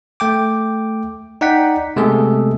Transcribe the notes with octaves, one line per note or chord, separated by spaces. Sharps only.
A3 G5 D6
D#4 D5 F#5 G5 B6
C3 G#3 A3 B3 G#4 A4